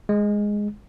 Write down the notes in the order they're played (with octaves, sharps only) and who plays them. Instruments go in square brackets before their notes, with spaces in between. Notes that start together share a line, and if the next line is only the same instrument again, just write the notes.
[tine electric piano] G#3